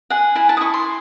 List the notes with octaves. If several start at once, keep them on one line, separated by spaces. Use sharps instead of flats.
G#4 F#5
E4 G#5
A5
D#6
E4 C#6
C6